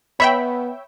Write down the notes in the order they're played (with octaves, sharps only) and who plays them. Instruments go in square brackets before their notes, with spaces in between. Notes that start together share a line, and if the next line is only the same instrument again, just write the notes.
[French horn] B3 [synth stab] C#5 E5 G5 [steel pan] B5